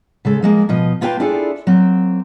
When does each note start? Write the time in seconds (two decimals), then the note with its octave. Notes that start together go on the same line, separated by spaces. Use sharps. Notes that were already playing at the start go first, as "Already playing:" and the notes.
0.25 C#3 G#3 A4
0.42 F3 G#3 A#3
0.69 B2 F3 D#5
1.01 A#3 F4 B4 C5 G5 A5
1.20 D4 E4 F4 G#4 A4 D5
1.67 F#3 A#3 C4